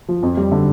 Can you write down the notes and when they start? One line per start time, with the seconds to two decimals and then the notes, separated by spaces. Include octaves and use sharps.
0.08 F3
0.23 F2
0.37 G3
0.52 D3